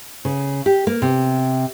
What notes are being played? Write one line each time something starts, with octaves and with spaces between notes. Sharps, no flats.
C#3
G4
A#3
C3